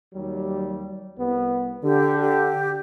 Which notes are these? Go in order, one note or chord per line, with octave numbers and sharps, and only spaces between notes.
D#2 F#3 G3
C2 B3
D3 G4
G4